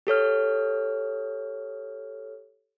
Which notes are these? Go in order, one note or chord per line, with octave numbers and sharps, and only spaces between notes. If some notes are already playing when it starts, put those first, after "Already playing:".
G4 A4 C#5 F6